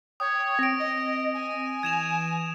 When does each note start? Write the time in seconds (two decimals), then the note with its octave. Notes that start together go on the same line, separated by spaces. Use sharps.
0.20 C#5 G5 D#6
0.59 C4 A#6 D7
0.79 D#5
1.34 G#5
1.83 E3 G#6 E7 F7